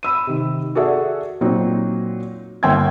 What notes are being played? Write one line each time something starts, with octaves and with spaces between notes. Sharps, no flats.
B5 E6 D#7
C3 D#3
F#4 G#4 A4 D5 E5 F#5
A#2 F#3 C4 D#4
G1 A#3 G5 C6 E6 G#6